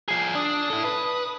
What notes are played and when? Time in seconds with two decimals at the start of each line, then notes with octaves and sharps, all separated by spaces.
0.08 F3 G#4 C7
0.35 D4 D#6
0.70 E4 A4
0.85 B4